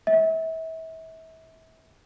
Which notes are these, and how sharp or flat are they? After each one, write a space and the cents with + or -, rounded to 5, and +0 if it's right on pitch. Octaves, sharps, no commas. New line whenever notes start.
E5 -35